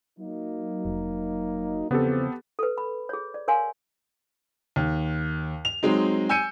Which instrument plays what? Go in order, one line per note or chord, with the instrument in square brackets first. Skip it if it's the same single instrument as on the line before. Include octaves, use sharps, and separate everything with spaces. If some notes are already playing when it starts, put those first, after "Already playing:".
[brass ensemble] F#3 A#3 D#4
[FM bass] F1
[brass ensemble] E2 F3 C4 [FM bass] C#3 [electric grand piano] B3 G4 A4
[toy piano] A4 B4
B5
G#4 C#5
D5
A#4 C#5 F5 G#5 C6
[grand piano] D#2
F7
F#3 G#3 C4 D#4
G#5 E6 G6 C#7 D#7